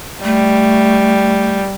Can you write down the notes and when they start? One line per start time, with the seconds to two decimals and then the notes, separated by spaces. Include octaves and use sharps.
0.24 G3 A3